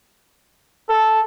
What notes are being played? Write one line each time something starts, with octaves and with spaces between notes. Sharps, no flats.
A4